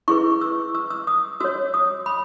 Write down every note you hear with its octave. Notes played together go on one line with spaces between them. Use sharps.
E4 G#4 B4 C#6
E6
E6
E6
D#6
F#4 C#5 E6
D#6
B5